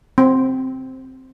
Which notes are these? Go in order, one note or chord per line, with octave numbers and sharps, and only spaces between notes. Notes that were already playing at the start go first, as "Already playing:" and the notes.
C4